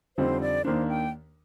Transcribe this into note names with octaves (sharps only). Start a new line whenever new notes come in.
F2 D3 G3 C4 D#4 C5
D5
D#2 D#3 A#3 D4 C5
G5